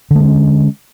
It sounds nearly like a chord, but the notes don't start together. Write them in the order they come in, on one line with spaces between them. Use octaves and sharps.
D3 A3 G#3 C#4